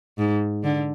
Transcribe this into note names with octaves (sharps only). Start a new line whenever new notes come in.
G#2
D3